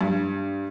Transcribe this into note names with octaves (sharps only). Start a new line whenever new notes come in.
G2